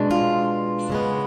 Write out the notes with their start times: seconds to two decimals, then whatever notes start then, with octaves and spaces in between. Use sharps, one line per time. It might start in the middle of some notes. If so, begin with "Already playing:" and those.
Already playing: B2 G#3 D4
0.11 F4
0.90 C#3 G#3 B3